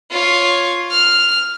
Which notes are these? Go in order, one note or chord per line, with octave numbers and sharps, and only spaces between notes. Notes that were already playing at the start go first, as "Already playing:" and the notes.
F4 C#5
F6